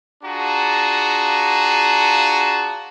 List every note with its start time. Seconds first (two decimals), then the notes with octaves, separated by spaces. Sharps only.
0.23 D4 F4 F#4 G#4 A5 A#5